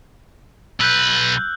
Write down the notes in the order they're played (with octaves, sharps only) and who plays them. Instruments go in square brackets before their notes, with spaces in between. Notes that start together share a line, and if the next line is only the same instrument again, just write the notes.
[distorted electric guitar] B1 B4 [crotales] E6 F#6 G6